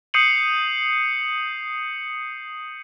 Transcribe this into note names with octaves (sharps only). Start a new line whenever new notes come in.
D#6 G6 C7 C#7 D#7 F#7